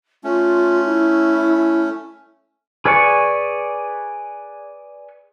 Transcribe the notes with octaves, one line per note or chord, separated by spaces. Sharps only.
A3 C#4 F4
E4
G#4 B4 D5 G#5 C#6